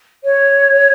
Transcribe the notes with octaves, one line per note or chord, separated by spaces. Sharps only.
C#5